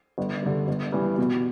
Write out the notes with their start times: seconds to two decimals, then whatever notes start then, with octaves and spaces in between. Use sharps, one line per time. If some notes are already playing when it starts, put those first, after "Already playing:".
0.18 G1
0.42 G2 D3
0.68 G1
0.92 G2 E3
1.18 B2